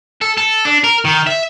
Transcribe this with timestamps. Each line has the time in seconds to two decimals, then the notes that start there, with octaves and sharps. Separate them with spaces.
0.21 A4
0.37 A4
0.65 D4
0.84 A#4
1.05 D#3
1.27 E5